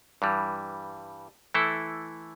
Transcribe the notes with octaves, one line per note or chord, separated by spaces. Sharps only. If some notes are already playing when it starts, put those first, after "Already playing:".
G2 E3 G3
E3 A3 E4 A4